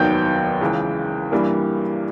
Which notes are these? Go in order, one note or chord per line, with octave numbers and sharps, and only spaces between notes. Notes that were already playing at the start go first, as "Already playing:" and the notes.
Already playing: F1 D#2 D#3 F#3 B3 G5 G6
C#2 C#3 E3
G2 E3 G3 A#3